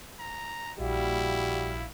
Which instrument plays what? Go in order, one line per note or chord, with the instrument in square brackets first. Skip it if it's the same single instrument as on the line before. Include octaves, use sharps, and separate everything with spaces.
[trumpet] A#5
[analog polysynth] A#1 F5 [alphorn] G3 [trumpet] E4 [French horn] F#4